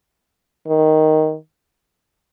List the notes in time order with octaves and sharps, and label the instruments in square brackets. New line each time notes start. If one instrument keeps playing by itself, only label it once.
[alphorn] D#3